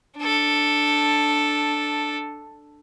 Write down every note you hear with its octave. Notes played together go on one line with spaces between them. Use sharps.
D4 A4